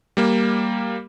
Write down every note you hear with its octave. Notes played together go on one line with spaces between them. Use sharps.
G3 A#3